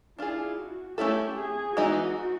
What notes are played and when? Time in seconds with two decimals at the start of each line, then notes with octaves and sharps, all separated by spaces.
0.19 D4 E4 F4 G#4
0.58 F#4
0.97 A3 C#4 E4 G4 A4
1.37 G#4
1.76 E3 G#3 B3 D#4 F#4